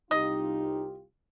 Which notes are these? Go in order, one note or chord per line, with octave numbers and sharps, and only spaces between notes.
C2 D#4 F4 G4 D#5